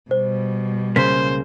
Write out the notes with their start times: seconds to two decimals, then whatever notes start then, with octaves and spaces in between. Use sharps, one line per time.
0.11 B2 G3 C5
0.96 C#2 C#3 A#3 C5 B6